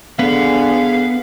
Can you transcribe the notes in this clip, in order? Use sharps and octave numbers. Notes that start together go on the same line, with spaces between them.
D3 B3 G#4 F5